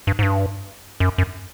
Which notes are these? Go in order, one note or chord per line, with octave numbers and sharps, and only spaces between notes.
G2
G#2
G2
F#2
F#2